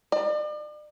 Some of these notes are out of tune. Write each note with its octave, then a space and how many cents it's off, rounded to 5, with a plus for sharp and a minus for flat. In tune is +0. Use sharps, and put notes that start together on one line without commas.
D5 +40